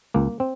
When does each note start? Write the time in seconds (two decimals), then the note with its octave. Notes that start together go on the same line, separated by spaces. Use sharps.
0.14 C#2 A#3
0.40 C4